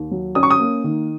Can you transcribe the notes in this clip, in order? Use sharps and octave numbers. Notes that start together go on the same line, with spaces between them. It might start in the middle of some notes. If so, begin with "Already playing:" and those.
Already playing: D#2
F#3
C#4 D#6
C#6
D#6
A#3
D#3